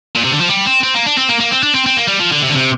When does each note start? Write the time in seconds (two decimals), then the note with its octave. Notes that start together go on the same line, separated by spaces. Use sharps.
0.15 A#2
0.24 C3
0.32 D3
0.41 F3
0.49 G3
0.67 C4
0.84 C4
0.94 A#3
1.06 D4
1.17 C4
1.29 A#3
1.40 A#3
1.51 C4
1.63 D4
1.74 C4
1.86 C4
1.97 A#3
2.08 G3
2.19 F3
2.32 D3
2.42 C3
2.49 D3
2.54 C3